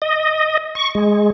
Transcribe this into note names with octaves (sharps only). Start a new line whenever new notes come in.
D#5
C#6
G#3